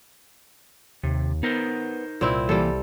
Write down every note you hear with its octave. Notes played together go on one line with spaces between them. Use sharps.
D#2 C3
B3 D#4 A#4 C5
C2 A#2 C4 E4
E3 G3 A#3 A4